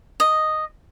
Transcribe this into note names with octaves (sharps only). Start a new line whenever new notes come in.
D#5